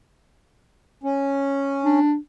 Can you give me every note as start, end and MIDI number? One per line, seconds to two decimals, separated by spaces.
1.03 1.99 61
1.84 2.17 62